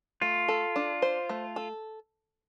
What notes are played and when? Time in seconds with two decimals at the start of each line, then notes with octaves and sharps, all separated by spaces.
0.21 A3 F4
0.48 A4
0.76 D4
1.02 C5
1.29 A3
1.56 A4